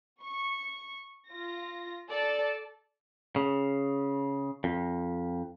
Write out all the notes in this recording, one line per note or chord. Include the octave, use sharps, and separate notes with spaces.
C#6
F4 A#6
A4 D5 A5
C#3
F2